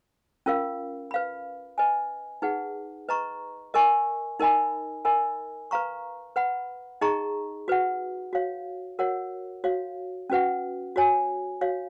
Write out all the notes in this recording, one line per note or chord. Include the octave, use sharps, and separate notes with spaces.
C#4 F4 A#4 F5
B4 F5 B5
B4 D#5 G#5
D#4 G#4 B4 F#5
B4 D#5 A#5 C#6
A#4 D#5 G#5 C#6
D#4 A#4 D#5 G#5 B5
A#4 D#5 G#5 B5
B4 F5 A#5 C#6
B4 F#5 B5
D#4 G#4 D#5 A#5 C#6
F#4 B4 F#5
F#4 C#5 F5
F#4 A#4 C#5 F#5
F#4 C#5 F5
C#4 F#4 B4 F#5
F#4 C#5 G#5
F#4 C#5 F5